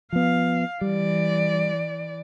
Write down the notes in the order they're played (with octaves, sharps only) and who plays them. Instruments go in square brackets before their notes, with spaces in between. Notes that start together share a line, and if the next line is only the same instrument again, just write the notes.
[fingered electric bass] F3 B3 [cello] F5
[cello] E3 D5 [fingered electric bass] G3